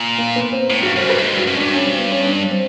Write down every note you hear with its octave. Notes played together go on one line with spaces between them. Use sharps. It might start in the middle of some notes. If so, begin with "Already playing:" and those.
Already playing: A#2
A#3
B3
C4
A2
G2 F#4
F#2 C5
G2 B4
A2
G#2
G2
F#4
F#2
G2 D4
C#4
C4
B3
C#4
D4
C4